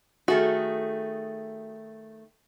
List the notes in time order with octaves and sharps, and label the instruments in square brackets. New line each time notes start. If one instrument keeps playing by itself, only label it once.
[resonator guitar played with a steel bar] D#3 A3 G#4 [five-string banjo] F#4